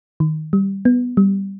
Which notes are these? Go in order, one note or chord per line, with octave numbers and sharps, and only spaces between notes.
D#3
G3
B3
G3